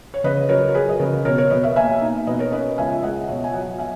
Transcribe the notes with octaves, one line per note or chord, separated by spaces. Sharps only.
C#5
C#3 B4 D#5
F#3 A#4 C#5
A#4
F#3 G#4 B4
D#5
C#3 A#4 C#5
B2 A#4 C#5
A#4 C#5
B2 B4 D#5
C#5 E5
A#3 E5 G#5
D#4
B2 B4 D#5
A#4 C#5
C#4 B4 D#5
C#2 E5 G#5
G#3 D#5 F#5
F#5
B2 C#5 E5
G#5
F#3 D#5 F#5
F#3 E5 G#5